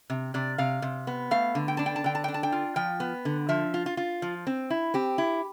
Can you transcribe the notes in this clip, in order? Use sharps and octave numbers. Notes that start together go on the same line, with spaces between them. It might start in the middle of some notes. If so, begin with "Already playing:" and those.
C3
C3 D5
C3 F5
C3
B3
A3 F5
D3
G5
D4 A5
G5
A5
D3 G5
A5
D4 G5
A5
G5
F4
F3 G5
B3
D3
F3 E5
F4
F4
F4
F3
C4
E4
C4 G4
E4